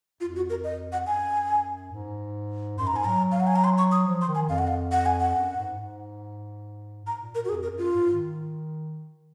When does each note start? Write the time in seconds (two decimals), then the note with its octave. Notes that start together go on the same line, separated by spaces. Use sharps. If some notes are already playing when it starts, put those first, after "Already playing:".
0.21 F2 F4
0.36 F#4
0.50 A#4
0.64 D#5
0.92 F#5
1.07 F#2 G#5
1.92 G#2
2.78 F#2 C6
2.87 A#5
2.92 G#2 G#5
3.05 F#3 A#5
3.32 F5
3.40 F#5
3.47 G#5
3.56 A#5
3.64 C6
3.78 C#6
3.92 D#6
4.07 F3
4.21 C6
4.28 D#3
4.35 G#5
4.49 F2 F5
4.58 F#5
4.67 F5
4.92 F#5
5.06 G#5
5.20 F#5
5.35 F#2
5.56 G#2
5.78 G#2
7.06 G#2 A#5
7.21 A#2
7.35 A#2 A#4
7.45 F#4
7.49 F2 G#4
7.63 A#4
7.71 F#2
7.78 F4
7.92 G#2
8.13 D#3